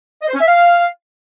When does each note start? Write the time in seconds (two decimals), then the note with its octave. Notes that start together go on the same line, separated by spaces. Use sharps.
0.22 D#5
0.28 C5
0.35 C#4
0.41 E5
0.47 F5